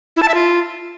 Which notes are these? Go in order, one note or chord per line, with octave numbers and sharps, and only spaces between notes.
E4
A5
E5
F4